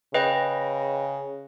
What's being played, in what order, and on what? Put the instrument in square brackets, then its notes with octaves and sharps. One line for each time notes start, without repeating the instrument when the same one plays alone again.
[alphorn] C#3 [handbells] B4 D#5 G5